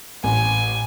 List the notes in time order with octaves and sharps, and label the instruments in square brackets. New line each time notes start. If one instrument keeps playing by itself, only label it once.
[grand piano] A1 [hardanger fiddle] G#5